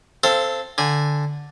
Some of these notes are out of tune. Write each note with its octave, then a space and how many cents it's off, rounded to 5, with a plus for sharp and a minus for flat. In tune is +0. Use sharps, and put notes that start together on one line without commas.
C4 +0 A4 +0 F5 -30
D3 +0 G#5 -15